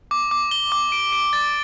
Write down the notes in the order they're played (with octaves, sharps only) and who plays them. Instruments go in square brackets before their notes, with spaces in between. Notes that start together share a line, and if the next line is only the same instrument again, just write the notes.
[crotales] D6
D6
G7
D6
D7
D7
A6